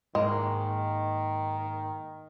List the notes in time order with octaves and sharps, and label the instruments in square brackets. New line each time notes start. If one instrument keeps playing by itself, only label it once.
[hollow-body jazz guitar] G#2 A#3 A#4 [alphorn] D#3 [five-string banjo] G#3